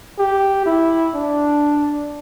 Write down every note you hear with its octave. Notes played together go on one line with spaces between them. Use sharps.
G4
E4
D4